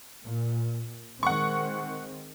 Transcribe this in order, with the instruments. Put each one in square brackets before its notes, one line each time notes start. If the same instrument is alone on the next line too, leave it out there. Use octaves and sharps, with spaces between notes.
[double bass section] A#2
[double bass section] D#3 G#3 C4 [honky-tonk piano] F#5 C#6